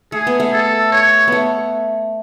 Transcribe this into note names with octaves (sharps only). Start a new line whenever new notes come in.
A3 G#4
B3
A3
A4
C#5
A3 B3